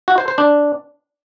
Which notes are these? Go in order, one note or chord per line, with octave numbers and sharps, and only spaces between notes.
F#4
C5
C5
D4